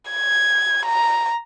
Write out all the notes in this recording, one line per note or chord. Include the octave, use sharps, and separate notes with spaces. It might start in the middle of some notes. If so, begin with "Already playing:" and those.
G#6
A#5